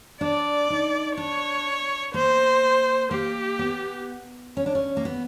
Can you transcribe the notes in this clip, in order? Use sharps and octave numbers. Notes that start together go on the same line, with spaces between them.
D4 D5
D#4
D4 C#5
A#3 C5
A#3 G4
B3
C#4
D4
C#4
A#3
B3